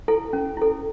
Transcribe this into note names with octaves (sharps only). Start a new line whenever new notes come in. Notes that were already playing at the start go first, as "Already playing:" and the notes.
E4 A4
C#4
E4 A4